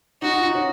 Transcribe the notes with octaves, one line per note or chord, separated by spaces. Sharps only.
D#4 F#4
F4
D#4
C#4